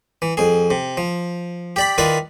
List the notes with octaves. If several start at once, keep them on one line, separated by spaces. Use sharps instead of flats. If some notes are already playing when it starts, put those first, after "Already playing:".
E3
F2 G#4
C3
F3
G4 D5 B5
D#3 E4 F4 B4 D5